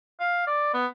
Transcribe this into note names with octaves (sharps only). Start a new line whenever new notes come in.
F5
D5
B3